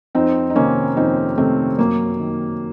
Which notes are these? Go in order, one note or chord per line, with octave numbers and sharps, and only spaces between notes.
F2 C4 D#4
D#4
C3 D#3 A#3 C#4
F2 C4 D#4
C3 D#3 A3 C4
F#2 A#3
D#3